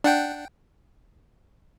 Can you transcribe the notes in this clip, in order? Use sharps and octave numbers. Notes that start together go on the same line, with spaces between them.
D4 F#5 G5